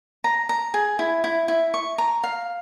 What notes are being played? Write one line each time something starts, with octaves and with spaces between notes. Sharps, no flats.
A#5
A#5
G#4
E4
E4
E4
C#6
A#5
F5